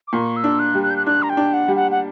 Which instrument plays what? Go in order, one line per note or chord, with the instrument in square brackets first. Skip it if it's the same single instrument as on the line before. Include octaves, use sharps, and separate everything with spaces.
[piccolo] D6
[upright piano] A#2 [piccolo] C#6
[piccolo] E6
[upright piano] D4
[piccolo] F#6
[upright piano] G3
[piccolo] F#6
G6
F#6
[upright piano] D4 [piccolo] F#6
[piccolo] A#5
G5
[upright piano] D4
[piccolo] F#5
[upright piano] G3
[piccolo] F#5
F#5